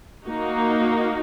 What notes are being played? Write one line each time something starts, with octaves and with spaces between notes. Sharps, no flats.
A#3 D#4 F#4